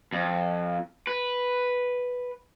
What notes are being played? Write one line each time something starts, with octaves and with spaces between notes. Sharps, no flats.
F2
B4